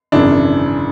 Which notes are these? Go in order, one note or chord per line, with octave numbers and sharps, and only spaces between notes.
G#1 F#2 C#3 E3 D4